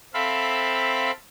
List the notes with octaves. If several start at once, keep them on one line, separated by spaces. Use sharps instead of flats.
C4 A4 E5 F5 B5